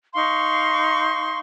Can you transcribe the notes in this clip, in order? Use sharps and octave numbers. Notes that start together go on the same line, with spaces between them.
D#4 F5 C6 C#6